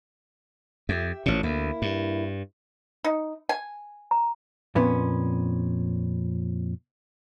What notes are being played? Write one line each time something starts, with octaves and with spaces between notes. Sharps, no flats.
F2 G4 E5
A1 F2 A#2 C#4 C#5
D2 A#3 E4
G2
D#4
G#5
A#5
F2 A#2 B3 C#4